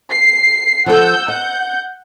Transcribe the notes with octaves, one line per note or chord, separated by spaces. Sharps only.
C7
F3 A4 F#5 E6 G6
D#5 F#5 G6